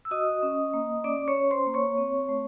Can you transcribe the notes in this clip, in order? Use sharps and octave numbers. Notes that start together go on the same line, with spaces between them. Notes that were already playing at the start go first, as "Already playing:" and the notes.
E6
F#4 D#5 D#6
C#4
A#3
C#4 D5 D6
C#5 C#6
C#4
C5 C6
A#3
C#5 C#6
C4
A3